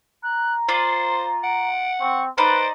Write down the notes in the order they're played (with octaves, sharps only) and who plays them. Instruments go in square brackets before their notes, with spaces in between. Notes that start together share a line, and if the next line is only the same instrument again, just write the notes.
[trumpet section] A#5 [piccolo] F#6
[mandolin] F4 D5 [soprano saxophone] C5 [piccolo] C7
[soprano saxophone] F#5 [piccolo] D7
[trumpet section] C4 [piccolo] C#6
[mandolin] D#4 D5 [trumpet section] B4 [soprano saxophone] C5 [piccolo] D7